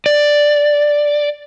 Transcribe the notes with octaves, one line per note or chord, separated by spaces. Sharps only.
D5